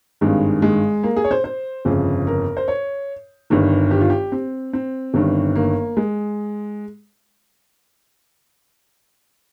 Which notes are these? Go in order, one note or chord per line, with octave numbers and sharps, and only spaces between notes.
G#1 G2 D#3 G#3
G#3
A#3
G#4
C#5
C5
C5
G1 F2 C#3 G#4
A#4
C5
C#5
G1 G2 D#3
G4
F4
G4
C4
C4
G1 G2 D#3
A#3
G#3